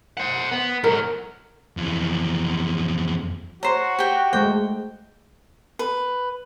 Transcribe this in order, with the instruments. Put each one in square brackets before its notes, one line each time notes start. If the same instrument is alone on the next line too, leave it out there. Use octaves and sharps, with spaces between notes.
[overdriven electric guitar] C5 F#5
B3
[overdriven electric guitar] G#2 F#3 [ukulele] A#4
[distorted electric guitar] F2 E3
[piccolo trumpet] F#4 [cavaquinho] C5 A#5 [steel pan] C#5
[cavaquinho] G4 G5
[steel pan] G#3 A3 C5 [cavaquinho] G5
[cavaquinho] B4